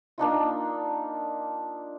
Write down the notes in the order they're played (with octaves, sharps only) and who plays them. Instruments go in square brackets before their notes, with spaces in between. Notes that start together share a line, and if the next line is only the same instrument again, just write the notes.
[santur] A#3 D4 D#4 F4